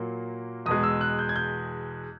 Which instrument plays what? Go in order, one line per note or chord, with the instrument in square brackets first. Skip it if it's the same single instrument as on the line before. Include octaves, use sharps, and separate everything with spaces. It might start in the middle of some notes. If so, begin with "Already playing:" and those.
Already playing: [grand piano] A#2 F#3 A#3
E2 B2 G#3 D#6
E6
F#6
G6
G#6
G6